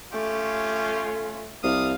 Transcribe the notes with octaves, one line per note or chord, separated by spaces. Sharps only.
A3 C#4 F4 G4
C2 F5 D#6